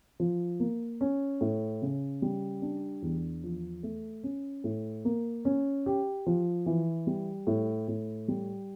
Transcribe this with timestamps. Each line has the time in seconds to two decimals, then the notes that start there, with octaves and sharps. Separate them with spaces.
0.20 F3
0.60 A#3
1.01 C#4
1.41 A2
1.82 C#3
2.22 G3
2.62 D4
3.02 E2
3.44 F3
3.83 A3
4.23 C#4
4.64 A2
5.05 A#3
5.45 C#4
5.86 G4
6.26 F3
6.66 E3
7.07 G3
7.47 A2
7.88 A2
8.28 G3